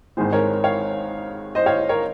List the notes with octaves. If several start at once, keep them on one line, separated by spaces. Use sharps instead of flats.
G#1 G#2 D#3 G#4 C5
A#4 C#5
C#5 F5
C5 D#5
C#5 F5
A#4 C#5